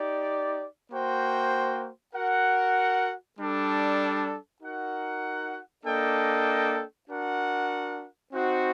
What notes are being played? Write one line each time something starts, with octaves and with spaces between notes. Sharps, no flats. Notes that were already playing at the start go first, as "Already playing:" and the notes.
Already playing: D#4 G4 D5
A#3 F#4 C5 G5
F#4 A#4 F#5
G3 D4 A4
D#4 F#4 A#4 F#5
A#3 D4 A4 D#5 G5
D4 F#4 A#4 F#5
C4 D#4 F#4 C5